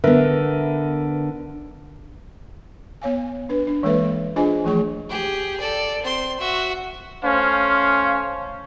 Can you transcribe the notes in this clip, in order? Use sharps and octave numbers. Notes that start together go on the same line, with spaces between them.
D3 B3 A#4 B4 E5
B3 C#5 F5 G#5
D4 B4
D4
E3 G#3 A#3 A4 B4 E5
D4 F4 G#4 C5 D#5 G#5
E3 F3 A3 G#4 C#6
G4 G#4
A4 D5
C4 C6
F#4 E5
A3 C#4 C5 F5